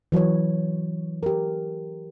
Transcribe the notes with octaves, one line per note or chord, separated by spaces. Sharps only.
E3 F#3 B4 C#5
G4 A#4